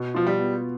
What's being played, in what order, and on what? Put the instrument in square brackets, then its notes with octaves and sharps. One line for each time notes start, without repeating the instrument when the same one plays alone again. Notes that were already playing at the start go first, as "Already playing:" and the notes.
Already playing: [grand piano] B2
[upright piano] F3 [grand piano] F4
[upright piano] G3
[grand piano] B3